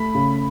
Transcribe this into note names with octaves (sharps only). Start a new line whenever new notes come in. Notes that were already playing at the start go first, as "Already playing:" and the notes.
Already playing: A3 B5
C#3